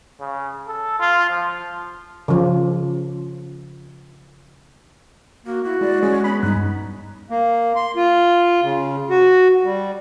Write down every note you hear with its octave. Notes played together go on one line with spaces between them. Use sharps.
C#3
A4
F4
F3
C#3 F3
A#3 F#4
E4 F#4
G#3 E4 D5
G#3 C#4
B3 C#4 B5
G2 D#4 F#6
A#3
C6
F4
C#3
F#4
G3